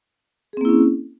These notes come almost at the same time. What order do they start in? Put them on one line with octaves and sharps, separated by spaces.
G#4 C4 A#3 E4 C#4